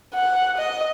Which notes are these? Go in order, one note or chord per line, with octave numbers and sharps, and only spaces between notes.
F#5
D#5